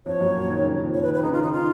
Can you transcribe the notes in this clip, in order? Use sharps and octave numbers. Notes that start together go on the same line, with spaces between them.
F2 F3 C#5
F#2 F#3
A#2 A#3
D#3
C#3
D#3
F2 F3
C#5
B4
D#3
B4
C#3 D#4
F4
D#3
D#4
F4